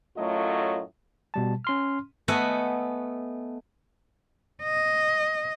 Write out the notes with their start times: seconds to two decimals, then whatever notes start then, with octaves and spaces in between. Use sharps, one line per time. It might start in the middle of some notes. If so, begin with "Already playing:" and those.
0.17 F#2 A2 F#3 A3 F4 D#5
1.34 B2 G3 A5
1.65 C#4 C6 F6
2.28 A3 B3 A4 D#5 F#5 G#5
4.63 D#5